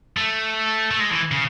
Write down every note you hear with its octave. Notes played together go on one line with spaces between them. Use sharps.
A3
A3
G#3
E3
C#3